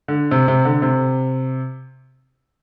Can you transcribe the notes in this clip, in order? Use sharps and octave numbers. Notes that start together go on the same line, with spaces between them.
D3
C3
C3
D3
C3